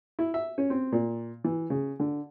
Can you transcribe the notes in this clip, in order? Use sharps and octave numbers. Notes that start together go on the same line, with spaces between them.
E4
E5
C#4
C4
A#2
E3
C#3
D3